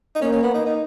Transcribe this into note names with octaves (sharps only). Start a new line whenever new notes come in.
D#4
A#3 C#4
C#4
B3
D#4
D#4